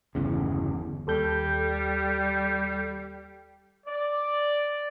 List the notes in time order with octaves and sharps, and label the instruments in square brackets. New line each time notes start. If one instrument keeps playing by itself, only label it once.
[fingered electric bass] G1 E2 C#3
[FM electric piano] D#2 A4 G6 [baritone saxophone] G3
[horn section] D5